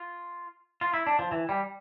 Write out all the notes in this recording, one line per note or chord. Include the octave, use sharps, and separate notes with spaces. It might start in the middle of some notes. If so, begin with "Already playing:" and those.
Already playing: F4
F4
E4
D4
F3
E3
G3